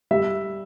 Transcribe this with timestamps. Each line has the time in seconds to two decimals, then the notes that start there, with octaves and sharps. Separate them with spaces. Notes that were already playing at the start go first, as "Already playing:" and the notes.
0.11 G3 E5